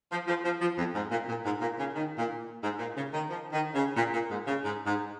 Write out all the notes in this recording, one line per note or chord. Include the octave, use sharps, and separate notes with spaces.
F3
F3
F3
F3
F2
G#2
A#2
A#2
G#2
A#2
C#3
D#3
A#2
G#2
A#2
C#3
D#3
F3
D#3
C#3
A#2
A#2
G#2
C#3
G#2
G#2